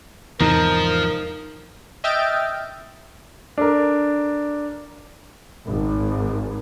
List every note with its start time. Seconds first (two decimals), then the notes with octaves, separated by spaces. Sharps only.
0.40 E2 G#2 C3 F3 D#4 A#4
2.04 D#5 E5 G5 F6 A6 D7
3.58 D4 A4 A#4
5.67 G#1